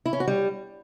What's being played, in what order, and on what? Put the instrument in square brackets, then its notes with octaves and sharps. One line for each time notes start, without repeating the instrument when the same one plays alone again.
[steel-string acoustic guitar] E4
C#4
F#4
G3